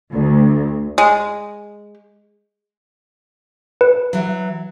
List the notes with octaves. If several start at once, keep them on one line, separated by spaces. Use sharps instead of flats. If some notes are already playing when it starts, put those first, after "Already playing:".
D2
G#3
B4
E3 F#3